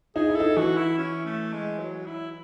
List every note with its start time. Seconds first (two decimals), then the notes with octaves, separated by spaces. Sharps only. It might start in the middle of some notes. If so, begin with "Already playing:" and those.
0.16 D#4 G#4
0.29 E4
0.36 D#4 A4
0.57 E3 F#4
0.77 E4
0.98 C#4
1.26 A3
1.53 G#3
1.79 F#3
2.07 E4